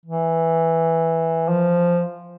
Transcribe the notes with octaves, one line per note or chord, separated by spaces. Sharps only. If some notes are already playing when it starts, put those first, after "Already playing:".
E3
F3